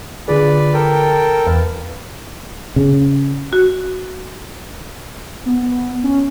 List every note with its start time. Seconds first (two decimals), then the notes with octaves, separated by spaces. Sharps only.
0.28 D3 F4 G#4 B4 D5
0.74 A4 A#4 G5
1.47 E2 B4 F5
2.76 C#3
3.53 F#4
5.46 B3
6.04 C#4